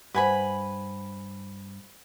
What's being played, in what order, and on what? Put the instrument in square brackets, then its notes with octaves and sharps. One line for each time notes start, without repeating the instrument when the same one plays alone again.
[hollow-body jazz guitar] G2 [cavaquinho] B4 G#5 B5 [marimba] C5 F#5